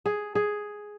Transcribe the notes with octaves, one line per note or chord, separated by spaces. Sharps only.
G#4
G#4